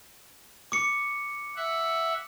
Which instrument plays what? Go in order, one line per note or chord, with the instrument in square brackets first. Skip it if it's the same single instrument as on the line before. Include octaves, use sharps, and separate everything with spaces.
[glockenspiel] D6 C#7
[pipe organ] E5 F#5